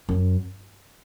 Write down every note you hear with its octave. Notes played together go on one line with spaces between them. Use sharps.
F#2